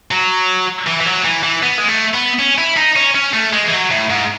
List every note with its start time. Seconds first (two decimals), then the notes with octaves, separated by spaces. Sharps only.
0.11 F#3
0.87 E3
1.00 E3
1.06 F#3
1.25 E3
1.44 E3
1.63 B3
1.78 G#3
1.88 A3
2.14 B3
2.39 C#4
2.58 E4
2.77 D#4
2.96 C#4
3.15 C#4
3.34 A3
3.53 G#3
3.66 E3
3.73 F#3
3.91 A2
4.10 G#2